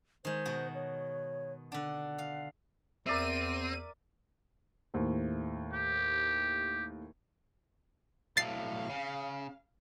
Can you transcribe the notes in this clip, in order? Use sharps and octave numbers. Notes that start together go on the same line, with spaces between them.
D#3 G#3 C5
B2 F#4
C#5
D3 D4 F#5
F5
E2 C4 A#4 D5 E5 D#7
D#2 A2 C5
G4
B1 A2 F5 A6 C7
C#3